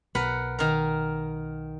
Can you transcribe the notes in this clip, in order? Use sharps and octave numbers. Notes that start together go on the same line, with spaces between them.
B1 A#4 B4 F#5
D#3 A#4